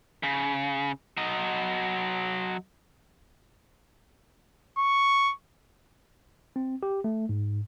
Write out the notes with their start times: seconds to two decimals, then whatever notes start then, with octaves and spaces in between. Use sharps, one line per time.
0.23 C#3
1.17 F#3 D#5
4.78 C#6
6.56 C4
6.83 G4
7.04 A3
7.29 G#2